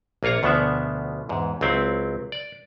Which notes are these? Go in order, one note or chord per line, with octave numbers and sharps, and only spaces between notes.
A#1 A#3 F4 C#5 A#5
D2 B2 F3 B3 D4 E5
E2 G#2
C#2 F#3 C4 E4
D5